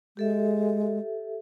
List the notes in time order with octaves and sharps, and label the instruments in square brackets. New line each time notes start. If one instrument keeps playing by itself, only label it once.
[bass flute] G#3 [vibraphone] G4 A4 E5